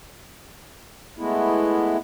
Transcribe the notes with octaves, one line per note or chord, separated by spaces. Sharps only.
G#3 A3 B3 E4